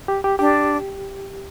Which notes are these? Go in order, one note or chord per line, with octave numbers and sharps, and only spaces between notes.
G4
G4
D4 G4